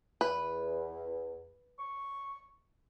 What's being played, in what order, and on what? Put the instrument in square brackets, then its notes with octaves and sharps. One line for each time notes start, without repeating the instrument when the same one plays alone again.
[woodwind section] E2 [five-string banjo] B4
[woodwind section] C#6